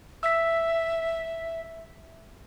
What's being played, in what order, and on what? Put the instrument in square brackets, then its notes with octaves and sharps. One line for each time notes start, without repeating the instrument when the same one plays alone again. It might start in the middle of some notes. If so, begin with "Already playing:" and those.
[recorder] E5 [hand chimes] E6 B6